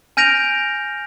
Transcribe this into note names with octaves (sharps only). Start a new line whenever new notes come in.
G#5 F6 G6 A#6 D7 F7